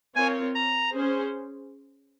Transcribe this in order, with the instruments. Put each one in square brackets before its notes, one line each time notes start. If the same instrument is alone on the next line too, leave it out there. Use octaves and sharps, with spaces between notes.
[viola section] C4 F4 A#4 C#5 [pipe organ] G#5
[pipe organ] A#5
[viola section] C#4 G#4 C5